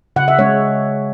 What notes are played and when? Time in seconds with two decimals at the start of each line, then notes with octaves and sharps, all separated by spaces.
0.16 C#3 F#5
0.28 E5
0.38 G#3 C#4 C#5